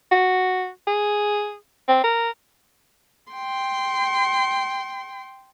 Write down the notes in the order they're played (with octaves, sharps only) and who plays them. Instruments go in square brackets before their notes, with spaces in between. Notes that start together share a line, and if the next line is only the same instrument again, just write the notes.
[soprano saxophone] F#4
G#4
C4
A#4
[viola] G5 C6